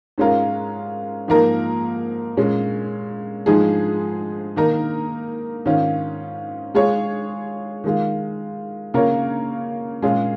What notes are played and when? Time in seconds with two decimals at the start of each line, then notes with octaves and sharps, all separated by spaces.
0.18 G#2 G#3 C#4 F4 A#4
1.28 G#2 F3 A#3 D#4 A#4
2.37 A#2 G#3 C#4
3.46 G#2 F3 G#3 D#4 G#4
4.56 D#3 A#3 D#4 A#4
5.65 G#2 D#3 C#4 F4
6.75 G#3 F4 G#4 C#5
7.84 D#3 G#3 F4
8.94 C#3 A#3 F4 A#4 C#5
10.02 A#2 G#3 C#4 F4 G#4